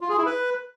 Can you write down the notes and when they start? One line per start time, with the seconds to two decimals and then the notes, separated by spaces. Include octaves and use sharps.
0.01 F4
0.09 G#4
0.18 E4
0.26 B4